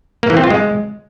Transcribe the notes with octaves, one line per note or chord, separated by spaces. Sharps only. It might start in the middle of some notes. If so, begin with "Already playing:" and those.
A#3
E3
C4
F4
G#3